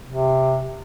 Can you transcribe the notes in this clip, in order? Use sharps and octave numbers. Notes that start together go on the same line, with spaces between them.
C3